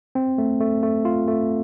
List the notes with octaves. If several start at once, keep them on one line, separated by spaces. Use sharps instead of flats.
C4
A3
A3
A3
F4
A3